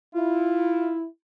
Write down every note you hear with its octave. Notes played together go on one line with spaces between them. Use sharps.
E4 F4